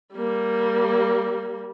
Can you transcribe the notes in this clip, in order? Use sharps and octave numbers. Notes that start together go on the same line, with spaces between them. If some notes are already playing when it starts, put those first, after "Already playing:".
G3 A#3